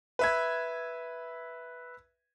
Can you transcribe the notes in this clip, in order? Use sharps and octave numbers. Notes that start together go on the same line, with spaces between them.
B4 E5 G#6